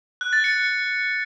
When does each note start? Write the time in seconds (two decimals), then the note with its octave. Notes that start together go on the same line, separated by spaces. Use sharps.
0.21 F#6
0.33 A6
0.44 C#7